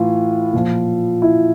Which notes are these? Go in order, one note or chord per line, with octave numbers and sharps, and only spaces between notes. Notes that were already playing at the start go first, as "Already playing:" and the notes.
Already playing: A2 E3 F4
A#2 F3
E4